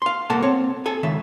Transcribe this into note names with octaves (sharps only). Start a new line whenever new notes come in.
F5 C6
C2 A#3 A4 F#5 A5
C4 C#5
A4 G#5
C#2 D#3 E5